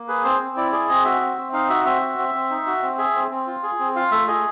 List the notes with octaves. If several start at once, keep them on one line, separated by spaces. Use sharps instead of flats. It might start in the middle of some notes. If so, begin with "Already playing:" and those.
Already playing: A#3
G#4 B4
C4 C5
C4
E4 D5
G#4 D5
C4 D#5
F#4 E5
C4
C4
D#4 F5
F#4 E5
C4 E5
F#4
C4
C4
D#4
F#4
C4
G#4 E5
C4
C4
F4
G#4
C4
F4 F5
A3 E5
G#4 D#5